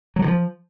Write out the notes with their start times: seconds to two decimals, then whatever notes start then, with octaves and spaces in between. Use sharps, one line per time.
0.16 F#3
0.22 D3
0.28 F3